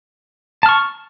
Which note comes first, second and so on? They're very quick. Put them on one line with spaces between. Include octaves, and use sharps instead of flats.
A5 F6 C#6